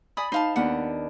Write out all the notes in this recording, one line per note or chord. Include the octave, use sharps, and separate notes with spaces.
D5 G#5 B5 D#6
D#4 C5 F5 A5
D#2 B3 D4 F#5